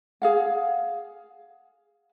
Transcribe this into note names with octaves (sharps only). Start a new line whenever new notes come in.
G#4 F5 F#5